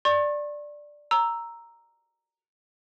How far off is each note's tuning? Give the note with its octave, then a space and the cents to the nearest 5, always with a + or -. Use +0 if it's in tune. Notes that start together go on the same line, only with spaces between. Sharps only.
D5 +5 C#6 -40
A#5 +0 E6 +0